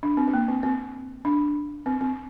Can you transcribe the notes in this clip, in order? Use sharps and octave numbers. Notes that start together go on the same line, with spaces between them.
D4
C4
C4
A#3
C4
C4
D4
C4
C4